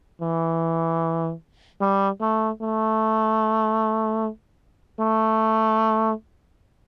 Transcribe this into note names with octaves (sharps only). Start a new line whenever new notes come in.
E3
G3
A3
A3
A3